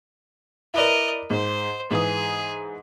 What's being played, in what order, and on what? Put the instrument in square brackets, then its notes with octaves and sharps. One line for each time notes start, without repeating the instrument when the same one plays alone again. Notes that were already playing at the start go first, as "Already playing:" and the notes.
[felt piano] E4 B4 D5 [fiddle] A#4 D#5
[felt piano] G#2 [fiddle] C5
[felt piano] G#2 E3 D#6 [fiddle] G#4